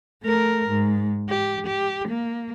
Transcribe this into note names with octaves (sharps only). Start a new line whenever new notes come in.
A3 A#4
G#2
G4
G4
A#3